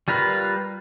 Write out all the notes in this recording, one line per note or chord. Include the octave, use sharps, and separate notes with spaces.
G3 F4 A#4 B4